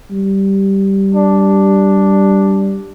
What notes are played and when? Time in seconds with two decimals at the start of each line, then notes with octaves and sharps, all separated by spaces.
0.11 G3
1.15 D4